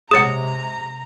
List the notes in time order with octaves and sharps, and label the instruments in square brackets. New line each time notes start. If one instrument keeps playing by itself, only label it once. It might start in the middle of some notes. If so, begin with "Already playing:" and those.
[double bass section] C3 G#3 [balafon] G#4 C#5 F#5 [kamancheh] A#5 [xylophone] D#6 C#7